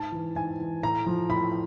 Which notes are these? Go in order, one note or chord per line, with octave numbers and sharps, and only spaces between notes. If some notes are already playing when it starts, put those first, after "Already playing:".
Already playing: G#2 A5
E3
G#2 G#5
E3
A2 A#5
F3
A2 B5